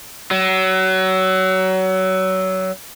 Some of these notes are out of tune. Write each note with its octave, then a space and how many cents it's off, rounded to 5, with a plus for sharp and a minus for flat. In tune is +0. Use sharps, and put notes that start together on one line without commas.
F#3 +25